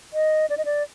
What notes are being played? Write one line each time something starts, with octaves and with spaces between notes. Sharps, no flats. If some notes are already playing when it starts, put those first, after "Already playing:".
D#5
D5
D#5
D5